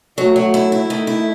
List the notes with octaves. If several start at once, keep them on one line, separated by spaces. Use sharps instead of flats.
F#3 A3
F#3
E4
E4
D#3 A3
E4